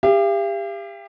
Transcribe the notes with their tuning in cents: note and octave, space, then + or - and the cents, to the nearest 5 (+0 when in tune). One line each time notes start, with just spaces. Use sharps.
G4 +30 F5 -45